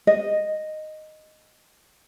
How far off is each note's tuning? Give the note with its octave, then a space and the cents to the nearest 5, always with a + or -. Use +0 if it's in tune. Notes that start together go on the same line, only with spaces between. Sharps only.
D#5 -5